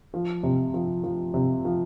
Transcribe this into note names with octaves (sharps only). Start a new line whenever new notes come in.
F3
C3
F3
F3
C3
F3